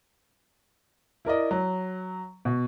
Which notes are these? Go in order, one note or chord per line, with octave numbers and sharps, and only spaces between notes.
E4 A#4 D5 D#5
F#3
B2